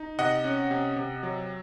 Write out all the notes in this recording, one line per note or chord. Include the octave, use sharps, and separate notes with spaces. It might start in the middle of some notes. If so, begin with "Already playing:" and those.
Already playing: D#4
C3 D#5 F#5
C#4
C3
C3
F#3